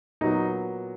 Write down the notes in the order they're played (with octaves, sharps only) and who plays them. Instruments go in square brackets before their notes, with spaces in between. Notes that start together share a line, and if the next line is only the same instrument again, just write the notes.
[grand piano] A#2 F#3 B3 D#4